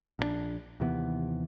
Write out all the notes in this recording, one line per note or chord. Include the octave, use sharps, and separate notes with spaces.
A#1 C#3 D4
D#2 C3 E3 B3